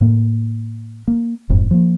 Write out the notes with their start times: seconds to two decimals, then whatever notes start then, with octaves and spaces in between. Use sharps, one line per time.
0.01 A2 A#3
1.08 A#3
1.49 E1 F2 G#2
1.71 F3 A#3